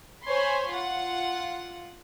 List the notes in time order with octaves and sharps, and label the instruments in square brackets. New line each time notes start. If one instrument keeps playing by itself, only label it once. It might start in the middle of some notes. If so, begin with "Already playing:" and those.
[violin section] C5 C#5 G#5 B5 C6
F4 F#5